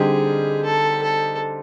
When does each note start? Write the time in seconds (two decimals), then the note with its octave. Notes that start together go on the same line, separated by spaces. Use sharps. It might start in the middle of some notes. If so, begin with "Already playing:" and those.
Already playing: D3 G3 C4 D#4 G4 G#4
0.65 A4
1.02 A4